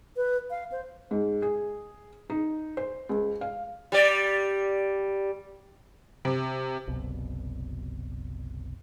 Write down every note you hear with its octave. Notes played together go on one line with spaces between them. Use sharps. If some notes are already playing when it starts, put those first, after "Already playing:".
B4
F5
C5
G#2
G#4
D#4
C5
C#2
F5
G3 D5
C3
F#1 C2 B2